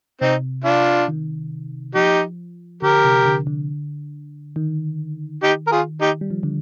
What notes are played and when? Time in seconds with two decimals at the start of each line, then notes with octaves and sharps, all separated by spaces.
0.21 C3 C4 D#4
0.64 D4 F4
1.08 D#3
1.95 F3 D#4 G4
2.82 D3 G4 A#4
3.04 C3
3.25 D3
3.47 D3
4.56 D#3
5.43 D#4 G4
5.67 A#4
5.72 F4 G#4
6.01 D#4 G4
6.21 G3
6.30 F3
6.43 D3